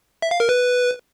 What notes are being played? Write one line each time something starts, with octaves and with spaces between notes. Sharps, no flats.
E5
F5
A#4
B4